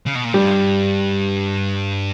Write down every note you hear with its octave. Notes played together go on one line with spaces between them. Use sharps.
C#3
B2
A#2
G2 G3